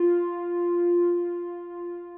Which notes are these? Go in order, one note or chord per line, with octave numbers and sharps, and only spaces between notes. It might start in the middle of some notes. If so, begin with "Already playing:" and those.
Already playing: F4